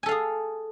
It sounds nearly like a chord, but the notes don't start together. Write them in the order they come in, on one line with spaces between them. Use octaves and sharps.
G#5 A4 F5 G#4